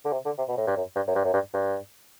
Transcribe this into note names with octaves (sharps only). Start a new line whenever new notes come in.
D3
C3
D3
C3
B2
A2
G2
F#2
G2
F#2
G2
F#2
G2
G2